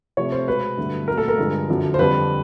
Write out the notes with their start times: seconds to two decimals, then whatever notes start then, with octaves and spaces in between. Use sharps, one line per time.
0.17 C3 F3 A3 C#5
0.32 C5
0.47 B2 G#3 B4
0.77 G2 D3 F#3 A3
1.08 A#2 F#3 A3 A#4
1.18 A4
1.28 A#4
1.38 G2 D3 F3 G#3
1.69 F#2 D3 F3
1.94 C5
1.98 F2 D3 G3 B4